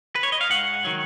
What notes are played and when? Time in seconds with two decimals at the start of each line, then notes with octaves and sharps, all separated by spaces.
0.15 B4
0.23 C#5
0.32 D#5
0.41 F5
0.50 G#2 F#5
0.85 D#3 F#3